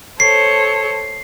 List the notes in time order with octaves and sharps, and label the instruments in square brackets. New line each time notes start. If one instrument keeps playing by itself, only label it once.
[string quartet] A4 C5 C#5 [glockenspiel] C7